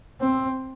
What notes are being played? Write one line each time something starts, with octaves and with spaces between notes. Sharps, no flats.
C4